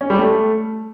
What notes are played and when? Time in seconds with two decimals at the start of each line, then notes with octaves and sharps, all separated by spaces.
0.01 C#4
0.10 G3
0.19 A3